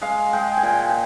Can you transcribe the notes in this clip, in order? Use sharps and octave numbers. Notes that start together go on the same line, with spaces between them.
G#3 F5
G#3 G5
G#5
A#2 G5
G5